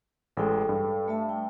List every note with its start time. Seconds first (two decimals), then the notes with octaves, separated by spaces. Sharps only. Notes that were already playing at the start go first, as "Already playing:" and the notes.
0.37 A1 G#3 A4 G5
0.69 G2
1.08 A3 E5 A5
1.29 G5